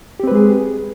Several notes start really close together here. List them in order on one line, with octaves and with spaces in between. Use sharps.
G4 C4 B4 G#3 G#4